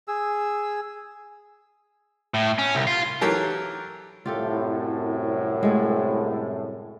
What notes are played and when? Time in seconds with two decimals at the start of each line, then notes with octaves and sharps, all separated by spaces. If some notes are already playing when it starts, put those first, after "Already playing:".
0.08 G#4 E6
2.34 A2
2.58 C#4
2.75 C2
2.87 F4
3.21 E3 F#3 G4 A4 A#4
4.26 C2 F#2 A2 F4 G4 A4
5.63 G#3 A3 E4